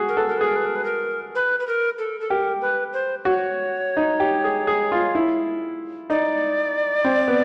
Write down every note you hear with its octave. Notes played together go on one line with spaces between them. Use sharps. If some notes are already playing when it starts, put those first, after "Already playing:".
Already playing: F#4 G#4
A#4
A4 B4
A#4
G#4 B4
A#4
B4
A#4
B4
A#4
B4
B4
A#4
A4
A4
G4 A#4
B4
C5
F#4 C#5
D#4
G4
G#4
G#4
F4
E4
D#4 D5
C4
B3